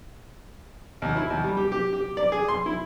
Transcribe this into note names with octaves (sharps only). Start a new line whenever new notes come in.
D#2
E4
D#2
G3
G4
G4
G4
D5
G#4
C6
E4